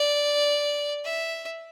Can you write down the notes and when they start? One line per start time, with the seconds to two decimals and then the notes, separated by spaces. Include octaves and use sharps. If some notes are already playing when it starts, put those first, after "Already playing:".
Already playing: D5
1.05 E5